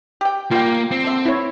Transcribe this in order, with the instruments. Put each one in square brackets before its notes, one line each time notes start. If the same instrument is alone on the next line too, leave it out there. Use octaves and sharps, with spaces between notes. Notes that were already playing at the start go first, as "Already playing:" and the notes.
[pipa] G4 G5
[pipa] G3 [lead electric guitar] A#3 [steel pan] F4 G5
[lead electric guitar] C4
[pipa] D3 E5
[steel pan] E4 C#5